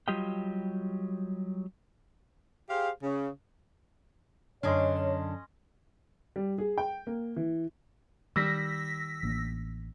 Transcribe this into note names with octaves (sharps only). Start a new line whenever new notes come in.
F#3 G3 F4 G4 D#5 G5
G4 G#4 C5 F5
C#3
F#2 D3 C#4 D4 C#5 D#5 C6
G3
G#4
G5
A#3
E3
D#3 G3 E6 A#6 B6
A1 A#3 D4